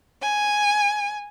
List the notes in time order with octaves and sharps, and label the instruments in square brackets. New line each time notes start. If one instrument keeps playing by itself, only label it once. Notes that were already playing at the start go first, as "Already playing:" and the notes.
[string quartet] G#5